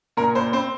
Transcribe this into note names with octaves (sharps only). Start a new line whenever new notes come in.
A#2 A#4
A#2 C5
C4 C5